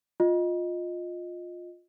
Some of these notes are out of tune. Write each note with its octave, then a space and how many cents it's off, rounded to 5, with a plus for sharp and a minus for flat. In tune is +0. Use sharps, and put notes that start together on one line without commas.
F4 +15 D#5 +0